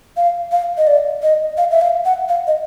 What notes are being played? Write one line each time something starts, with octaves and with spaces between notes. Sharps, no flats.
F5
F5
D#5
D5
D#5
F5
E5
F5
F#5
F5
D#5